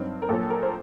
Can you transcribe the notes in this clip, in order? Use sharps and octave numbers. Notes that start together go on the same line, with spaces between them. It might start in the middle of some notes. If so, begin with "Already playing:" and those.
Already playing: G2 F#3 C4 D#4
A#4
A#1 A#2 F#3 A4
A#4
C5